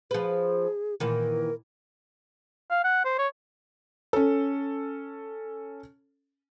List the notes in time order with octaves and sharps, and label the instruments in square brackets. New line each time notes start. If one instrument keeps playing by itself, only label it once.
[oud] F3 B4 [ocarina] G#4
[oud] A#2 D#3 E3 [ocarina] A#4
[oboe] F5
F#5
C5
C#5
[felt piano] C#4 A4